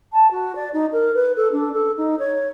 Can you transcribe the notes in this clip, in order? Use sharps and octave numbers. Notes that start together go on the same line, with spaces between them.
A5
F#4
D5
D#4
A#4
B4
A4
D4
A4
D#4
C#5